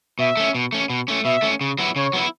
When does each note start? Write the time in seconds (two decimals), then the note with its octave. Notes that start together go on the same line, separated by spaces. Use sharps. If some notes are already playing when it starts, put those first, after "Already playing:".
0.19 B2 E5
0.37 A3 C#4
0.55 B2
0.72 A3 C#4
0.90 B2
1.08 A3 C#4
1.25 B2 E5
1.42 A3 C#4
1.61 C#3
1.78 F#3 B3 E4
1.96 C#3 C#5
2.13 F#3 B3 E4